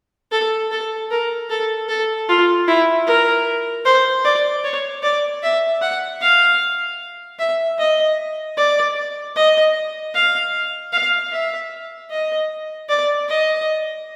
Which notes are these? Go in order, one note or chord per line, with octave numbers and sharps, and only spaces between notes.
A4
A4
A#4
A4
A4
F4
E4
A#4
C5
D5
C#5
D5
E5
F#5
F5
E5
D#5
D5
D#5
F5
F5
E5
D#5
D5
D#5